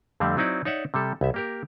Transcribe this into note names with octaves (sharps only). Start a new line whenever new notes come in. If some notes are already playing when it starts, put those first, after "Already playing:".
F2 D3 G3 A3 C4
F#3 C4 D#4 E4 D5
D#4 C#5 D5 E5 F#5
C3 G3 A4
C2 E5
A#3 G4 A#4